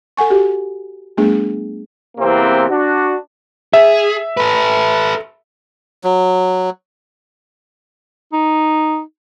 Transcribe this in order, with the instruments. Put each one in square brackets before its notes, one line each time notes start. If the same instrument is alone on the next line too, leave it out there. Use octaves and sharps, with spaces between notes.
[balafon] A4 F#5 G#5 C#6
F#4 G4
G3 A3 B3 D4 G#4
[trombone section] E2 C3 E3 A#3 C4
D4 F#4
[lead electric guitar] G#4 [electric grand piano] E5
[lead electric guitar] A4 B4
[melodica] F#3
[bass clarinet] D#4